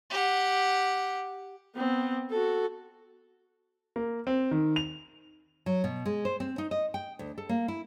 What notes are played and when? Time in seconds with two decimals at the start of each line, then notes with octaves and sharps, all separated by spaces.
0.10 G4 F#5
1.75 B3 C4
2.30 F#4 A4
3.96 A#3
4.27 C4
4.51 D#3
4.76 F7
5.66 F#3
5.84 B2
6.05 G#3
6.25 C5
6.40 C4
6.58 D#4
6.71 D#5
6.94 G5
7.19 D2
7.38 A4
7.49 A#3
7.68 E4